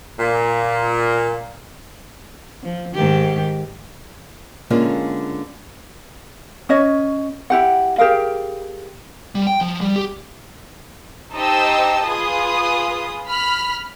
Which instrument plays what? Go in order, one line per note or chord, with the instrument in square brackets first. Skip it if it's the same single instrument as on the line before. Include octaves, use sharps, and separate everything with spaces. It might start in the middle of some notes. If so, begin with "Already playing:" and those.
[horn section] A#2
[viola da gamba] F3
G#2 D#3 G4
[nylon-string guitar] D3 G#3 A#3 C#4 F4
[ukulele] C#4 C#5 D#5
E4 G4 F#5
G4 G#4 A#4 F5
[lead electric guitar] G3
G5
F3
G3
G4
[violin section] D#4 G4 C5 D#5 A5 E6
F4 G#4 B4 D#6
B5 F6